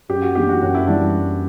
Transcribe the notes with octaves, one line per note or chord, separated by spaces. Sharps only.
F#2 G4
F#4
E3 A#3 D4 G4
F#4
F#2 F#4
E4
E3 G3 D4